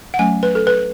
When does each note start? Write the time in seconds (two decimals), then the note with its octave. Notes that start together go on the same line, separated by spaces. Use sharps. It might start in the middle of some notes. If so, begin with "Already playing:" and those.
0.14 F#5
0.19 F#3 A3 C#4 G#5
0.43 B4
0.55 A4
0.67 B4